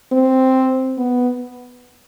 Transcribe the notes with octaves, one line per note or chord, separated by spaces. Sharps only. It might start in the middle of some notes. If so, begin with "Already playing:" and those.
C4
B3